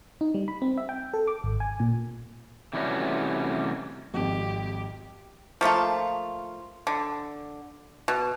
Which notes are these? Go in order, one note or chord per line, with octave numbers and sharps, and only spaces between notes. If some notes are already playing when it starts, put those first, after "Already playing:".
D#4
G3
B5
C4
E5
G5
A4
D6
G#1
G#5
A#2
C3 E3 G3 A3 C#4 F#4
G#1 F2 G4
F3 A3 A#3 F4
D3
B2